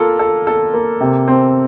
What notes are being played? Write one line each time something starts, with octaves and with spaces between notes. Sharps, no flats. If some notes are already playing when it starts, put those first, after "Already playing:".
Already playing: A#3 F4 A4
A4
A4
A#3
C3
C4